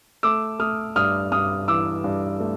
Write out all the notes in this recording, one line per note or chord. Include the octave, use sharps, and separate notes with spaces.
A3 D6 E6
A3 D#6 F6
G2 D#6 F6
G2 D#6 F6
E3 D6 E6
G2
A3